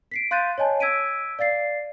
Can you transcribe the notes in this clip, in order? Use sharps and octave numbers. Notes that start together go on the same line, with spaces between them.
B6 C7 D7
F5 C6 F#6 G6 A6 D#7
C#5 D#5 G#5 A5
E6 G#6 B6 D7 D#7
D5 F5 A6 C7